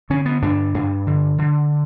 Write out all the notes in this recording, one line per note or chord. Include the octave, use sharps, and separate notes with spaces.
D3 C#4
B3
G2 D4
G2
D3
D3